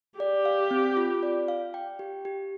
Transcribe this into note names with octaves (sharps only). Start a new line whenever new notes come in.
G4 D5
F5
C4
F4
D5
F5
G5
G4
G4